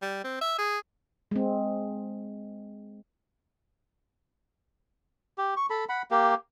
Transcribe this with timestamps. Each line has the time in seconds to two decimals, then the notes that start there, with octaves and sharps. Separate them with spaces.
0.02 G3
0.24 C4
0.41 E5
0.58 G#4
1.31 G#3 C4
5.38 G4
5.57 C#6
5.70 A4 B5
5.89 F#5 B5
6.11 A#3 G4